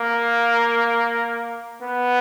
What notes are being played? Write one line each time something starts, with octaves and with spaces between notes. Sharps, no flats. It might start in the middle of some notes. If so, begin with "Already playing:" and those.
Already playing: A#3
B3